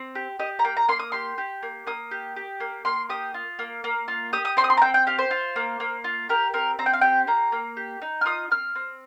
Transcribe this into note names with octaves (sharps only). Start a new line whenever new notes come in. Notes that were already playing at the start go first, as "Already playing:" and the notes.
Already playing: C4
G4
G4 D#5
A#5
A#3 G5
A#5
A#3 C6
D#6
G4 C6
G4
A#3
A#3 D#6
G4
G4
A#3
A#3 C6
G4 D#6
F4
A#3
A#3
F4
G4 D#6
D#6
C4 C6
D#6
C6
A#5
C4 G5
G5
G4 F5
C5
F4
A#3
A#3
F4
G4 A#4
C4 A#4
C4 A#5
G5
F5
G4 G5
A#3 A#5
A#3
G4
D#4
F6
F4 D#6
C4 F6
C4